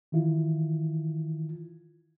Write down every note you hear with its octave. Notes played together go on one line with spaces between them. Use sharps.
D#3 E3 E4 F4